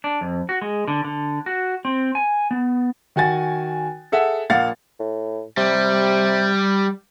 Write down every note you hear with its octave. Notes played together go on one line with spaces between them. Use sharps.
D4
F2
F#4
G#3
D3
D3
F#4
C4
G#5
B3
D#3 F#4 G#5 A6
G#4 A4 E5 F#5
A#1 A#3 F5 F#5 A6
A2
C3 G3